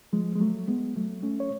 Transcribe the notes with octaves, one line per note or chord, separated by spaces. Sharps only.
F3 G#3
G#3
F#3 A3
G#3 B3
F#3 A3
A3 C#4
C#5